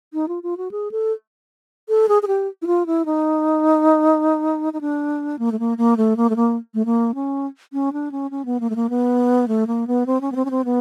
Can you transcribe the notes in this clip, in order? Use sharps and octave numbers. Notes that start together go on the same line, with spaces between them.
D#4
F4
F4
F#4
G#4
A4
A4
G#4
G#4
G4
E4
F4
E4
D#4
D#4
D4
A#3
A3
A#3
A#3
A3
A#3
A3
A#3
A3
A#3
C#4
C#4
D4
C#4
C#4
B3
A#3
A3
A#3
B3
A3
A#3
B3
C4
C#4
B3
C4
C#4
C4
B3